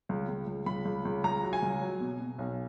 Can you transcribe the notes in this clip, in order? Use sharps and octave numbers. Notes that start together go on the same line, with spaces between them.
C#2
C#2
C#2
C#2 B5
C#2
C#2
C#2 A#5
F#3
G#5
C#2
F#3
B2
B2
B1